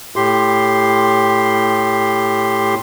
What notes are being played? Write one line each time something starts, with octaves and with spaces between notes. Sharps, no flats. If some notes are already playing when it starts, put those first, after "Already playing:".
A2 G4 C6